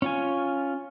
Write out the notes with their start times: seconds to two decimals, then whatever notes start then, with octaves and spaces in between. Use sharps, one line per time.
0.02 C#4 F4 G#5